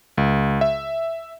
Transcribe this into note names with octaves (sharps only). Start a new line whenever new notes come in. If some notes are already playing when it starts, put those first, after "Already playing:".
C#2
E5